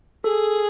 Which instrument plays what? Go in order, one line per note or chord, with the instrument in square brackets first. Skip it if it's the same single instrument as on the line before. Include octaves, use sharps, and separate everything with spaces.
[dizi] G#4 [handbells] A4